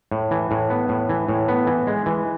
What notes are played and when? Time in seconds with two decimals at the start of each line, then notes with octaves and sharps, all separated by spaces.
0.12 A2
0.31 E3
0.51 A2
0.70 B3
0.89 A2
1.09 E3
1.29 A2
1.48 B3
1.67 E3
1.87 G#3
2.06 E3